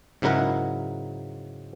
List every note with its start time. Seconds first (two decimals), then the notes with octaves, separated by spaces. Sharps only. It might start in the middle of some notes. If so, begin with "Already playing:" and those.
0.22 G#2 C#3 F#3 E4 A#4 F#5